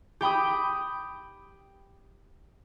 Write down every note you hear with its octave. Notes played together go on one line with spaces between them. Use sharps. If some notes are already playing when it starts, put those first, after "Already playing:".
G4 G5 B5 D#6